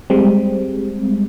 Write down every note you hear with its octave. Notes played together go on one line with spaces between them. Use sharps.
G3 G#3 C4